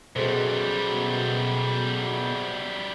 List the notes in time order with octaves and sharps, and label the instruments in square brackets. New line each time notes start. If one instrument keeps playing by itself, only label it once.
[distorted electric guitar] F#2 G3 [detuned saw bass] B2 [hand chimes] G#4 A4 C5